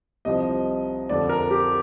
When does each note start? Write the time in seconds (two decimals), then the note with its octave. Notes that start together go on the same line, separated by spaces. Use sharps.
0.25 C2 C3 F3 D#5
1.09 F2 D3 F3 D5
1.29 A#4
1.51 G4